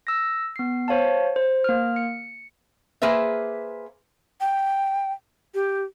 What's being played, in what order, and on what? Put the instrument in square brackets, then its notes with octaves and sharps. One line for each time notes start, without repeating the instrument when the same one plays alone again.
[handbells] E6 A#6
B3 C7
C5 C#5 F5 A5
C5
A#3 F6
C#7
[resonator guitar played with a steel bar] A#3 G#4 B4 C5 E5
[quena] G5
G4